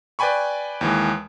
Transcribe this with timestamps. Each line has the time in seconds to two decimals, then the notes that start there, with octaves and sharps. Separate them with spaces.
0.19 B4 D5 G5 G#5 B5 C#6
0.81 D#2 E3 G#3